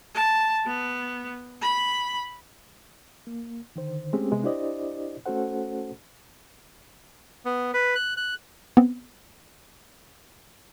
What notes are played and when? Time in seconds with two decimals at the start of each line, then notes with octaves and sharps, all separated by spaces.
0.15 A5
0.66 B3
1.62 B5
3.27 A#3
3.76 D3 D#3 C5
4.13 G#3 A3 C4 C#4 G4 G#4
4.31 C3 G#3 B3
4.43 D4 E4 G4 C5 D5 D#5
5.26 A3 C#4 F#4 A4 C5 F#5
7.45 B3
7.74 B4
7.95 F#6
8.17 F#6
8.77 B3 C4